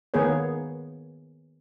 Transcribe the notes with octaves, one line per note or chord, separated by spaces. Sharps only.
D#3 A#3 B3 G#4 B4 C#5